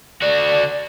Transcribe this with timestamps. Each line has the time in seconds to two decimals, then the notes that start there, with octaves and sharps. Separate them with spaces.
0.22 D3 F#4 D5